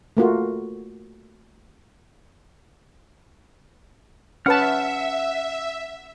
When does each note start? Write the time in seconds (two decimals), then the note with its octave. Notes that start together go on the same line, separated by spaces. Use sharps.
0.17 A3 A#3 F4 F#4
4.46 C#4 B4 E5 F#5 A5 F6